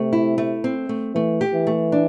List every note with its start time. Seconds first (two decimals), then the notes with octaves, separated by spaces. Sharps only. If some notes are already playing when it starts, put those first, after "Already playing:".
Already playing: C3 A3
0.13 E4
0.38 A3
0.64 C4
0.89 A3
1.15 E3 A3
1.41 G4
1.54 E3
1.67 A3
1.92 D4